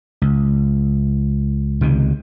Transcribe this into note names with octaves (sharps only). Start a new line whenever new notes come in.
C#2
C#2 C3 D#3